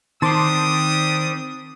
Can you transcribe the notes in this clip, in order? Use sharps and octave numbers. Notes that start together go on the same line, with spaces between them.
D#3 G3 C4 D4 A5 C6 D6 D#6